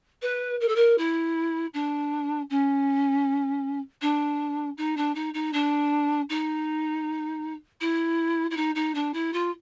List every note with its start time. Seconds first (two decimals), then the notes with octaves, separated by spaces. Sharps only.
0.22 B4
0.60 A#4
0.68 A4
0.75 A#4
0.98 E4
1.73 D4
2.50 C#4
4.01 D4
4.77 D#4
4.96 D4
5.15 D#4
5.33 D#4
5.53 D4
6.29 D#4
7.80 E4
8.50 E4
8.56 D#4
8.75 D#4
8.94 D4
9.13 E4
9.33 F4